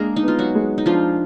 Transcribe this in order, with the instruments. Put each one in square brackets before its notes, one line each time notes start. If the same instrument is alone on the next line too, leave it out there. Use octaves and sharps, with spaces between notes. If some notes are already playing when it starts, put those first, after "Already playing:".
Already playing: [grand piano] G#3 D4 [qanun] A#3 G#4 A#4
[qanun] D#4
[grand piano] B3 [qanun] F4
[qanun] F#3 F#4
[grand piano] G#3
[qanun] D#4
[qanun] F3 F4 [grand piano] D4